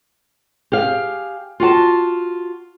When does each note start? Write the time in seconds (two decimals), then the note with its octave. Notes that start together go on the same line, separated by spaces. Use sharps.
0.72 G4 G#4 F5
1.60 F4 F#4 F#5 A5